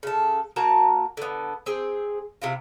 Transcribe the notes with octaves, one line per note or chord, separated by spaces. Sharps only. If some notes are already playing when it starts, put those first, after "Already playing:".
C#3 A4
A#3 F#4 A5 A#5
D3 B3
C4 G#4
C3 E4 F4